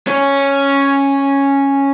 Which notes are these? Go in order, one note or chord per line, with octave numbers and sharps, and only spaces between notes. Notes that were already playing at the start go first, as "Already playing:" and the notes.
C#4 C#5